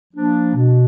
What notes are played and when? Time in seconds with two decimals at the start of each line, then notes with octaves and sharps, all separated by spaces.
0.13 F3 A#3 D4
0.55 B2